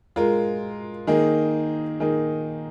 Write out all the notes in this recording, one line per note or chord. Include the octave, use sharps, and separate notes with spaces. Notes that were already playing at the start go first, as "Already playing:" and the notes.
G#3 F4 A#4
D#3 A#3 D#4 G#4
D#3 A#3 D#4 G#4